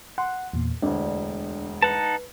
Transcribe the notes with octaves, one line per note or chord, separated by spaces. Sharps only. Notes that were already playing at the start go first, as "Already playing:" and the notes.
F#5 C6
E2 A#2
E1 D2 D4 D5
D#4 B4 F#5 A5